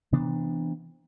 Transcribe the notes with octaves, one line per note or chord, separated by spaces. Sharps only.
C3 E3 B3 D4